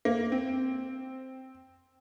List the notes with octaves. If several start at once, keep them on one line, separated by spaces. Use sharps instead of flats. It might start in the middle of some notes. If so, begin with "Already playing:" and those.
A#3
C4